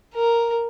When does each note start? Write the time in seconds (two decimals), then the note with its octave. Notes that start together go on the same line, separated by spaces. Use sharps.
0.15 A#4